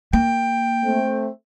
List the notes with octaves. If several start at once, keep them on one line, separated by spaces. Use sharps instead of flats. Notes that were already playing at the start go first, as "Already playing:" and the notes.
A#3 G5
A3 C4